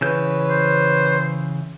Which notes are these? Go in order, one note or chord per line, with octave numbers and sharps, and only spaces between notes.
C#3 E3 B4 C#5 G6
C5